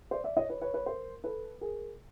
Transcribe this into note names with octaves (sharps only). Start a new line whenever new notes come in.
C5 D5
D5 E5
C#5 D#5
B4 C#5
B4 C#5
B4 C#5
A#4 C5
A4 B4
G#4 A#4